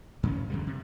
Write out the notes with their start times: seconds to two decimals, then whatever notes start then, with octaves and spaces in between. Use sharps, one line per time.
0.23 F#2 C#3 C#4
0.50 E2 D3 G3
0.67 C3